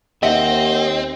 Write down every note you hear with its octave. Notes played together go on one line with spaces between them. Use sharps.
D#2 C4 D#5 E5 F#5